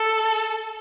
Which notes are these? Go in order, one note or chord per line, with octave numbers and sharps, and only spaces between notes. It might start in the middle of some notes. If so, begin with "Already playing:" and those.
Already playing: A4